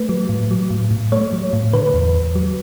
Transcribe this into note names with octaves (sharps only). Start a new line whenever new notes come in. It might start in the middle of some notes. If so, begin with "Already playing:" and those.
Already playing: A3 B4
F#3
A2
F#3
A2
A2
A3 C#5
F#3
A2
D3 B4
E2
E2
F#3